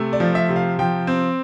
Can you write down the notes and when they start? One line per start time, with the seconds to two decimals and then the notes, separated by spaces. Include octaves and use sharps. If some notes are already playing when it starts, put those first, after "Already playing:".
Already playing: C3 A3
0.13 D5
0.20 F3
0.35 E5
0.49 C3
0.56 F5
0.79 F3 G5
1.07 C4